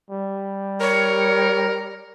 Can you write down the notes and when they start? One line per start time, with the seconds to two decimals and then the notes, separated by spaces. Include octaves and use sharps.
0.10 G3
0.80 A#4 C#5